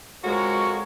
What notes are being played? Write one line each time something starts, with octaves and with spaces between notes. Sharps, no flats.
F2 G#3 F#4 A#4 C#5